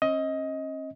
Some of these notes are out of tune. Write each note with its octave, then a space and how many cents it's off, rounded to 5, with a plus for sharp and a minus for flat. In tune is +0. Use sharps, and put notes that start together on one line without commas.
C#4 -45 D#5 +20